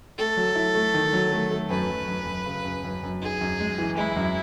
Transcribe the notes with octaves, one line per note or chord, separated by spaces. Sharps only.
A3 A4
F#3
E4
A3
D#3
F#3
A3
A3
F#2 B4
F#2
F#2
F#2
C#3
F#2
F#2
F#2
D#4 G#4
F#2
G#3
E3
G#3 E4
F#2